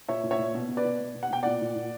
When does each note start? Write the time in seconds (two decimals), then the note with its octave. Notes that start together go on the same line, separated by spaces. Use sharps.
0.08 A#2 C#5 E5
0.24 A#2
0.31 C#5 E5
0.39 A#2
0.54 B2
0.69 B2
0.77 B4 D5
0.85 B2
0.99 B2
1.15 B2
1.23 F#5
1.30 B2 G5
1.43 A#2 D5 F#5
1.61 A#2
1.75 A#2